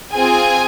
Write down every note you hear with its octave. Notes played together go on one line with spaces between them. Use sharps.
C4 F4 G#4 G#5